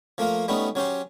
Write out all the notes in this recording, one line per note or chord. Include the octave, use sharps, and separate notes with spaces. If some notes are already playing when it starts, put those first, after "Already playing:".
F3 A3 A#3 F4
G3 A3 B3 C#4 D#4
F#3 C#4 G4 C5